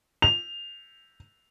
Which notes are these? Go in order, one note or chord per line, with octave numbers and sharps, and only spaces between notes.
F7